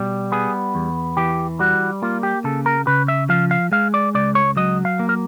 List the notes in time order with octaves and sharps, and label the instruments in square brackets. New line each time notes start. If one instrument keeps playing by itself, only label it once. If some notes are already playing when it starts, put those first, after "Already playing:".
Already playing: [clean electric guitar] B2 G3
B3 G#4
E2
E3 G4
G3 F#4
A#3 F4
G4
C#3 A4
A#4
C#3 B4
E5
F3 F5
F5
G#3 F5
D5
C#2 D5
C#5
F#3 D#5
F5
A#3
A#4